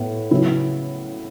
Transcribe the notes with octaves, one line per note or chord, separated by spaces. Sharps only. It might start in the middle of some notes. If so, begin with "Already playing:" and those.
Already playing: A2 B3
C#3 F#3 B3 E4